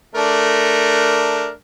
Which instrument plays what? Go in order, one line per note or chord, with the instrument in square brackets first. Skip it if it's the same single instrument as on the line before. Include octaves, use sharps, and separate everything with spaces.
[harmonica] A3 D4 A#4